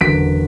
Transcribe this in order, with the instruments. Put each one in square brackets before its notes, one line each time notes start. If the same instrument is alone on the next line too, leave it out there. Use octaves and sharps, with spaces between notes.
[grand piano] F#1 E2 D3 F#3 B6 D7